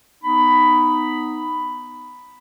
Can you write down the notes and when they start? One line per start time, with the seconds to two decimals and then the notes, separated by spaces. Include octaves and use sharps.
0.24 B3 D#4 B5